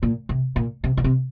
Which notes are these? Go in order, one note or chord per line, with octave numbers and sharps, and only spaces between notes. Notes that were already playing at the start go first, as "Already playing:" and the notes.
A#2
C3
A#2
C3
A#2
C3